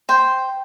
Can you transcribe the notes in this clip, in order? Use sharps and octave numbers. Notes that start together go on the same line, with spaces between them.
C5 G5